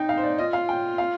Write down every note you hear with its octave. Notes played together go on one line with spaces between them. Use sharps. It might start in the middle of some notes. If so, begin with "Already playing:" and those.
Already playing: D#4 G5
F5
C5
D5
F4 D#5
F5
G5
F5